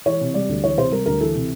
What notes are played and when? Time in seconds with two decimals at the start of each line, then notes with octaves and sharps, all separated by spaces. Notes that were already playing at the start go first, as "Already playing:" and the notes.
0.06 E3 C#5
0.21 C3
0.34 G3 D5
0.49 D2
0.64 E3 C#5
0.77 C3 C5
0.91 G3 A#4
1.06 D2 A#4
1.21 E3 A4
1.35 C3